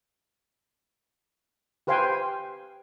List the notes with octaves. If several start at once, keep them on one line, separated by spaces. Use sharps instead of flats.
G4 B4 C5 F5 G5 G#5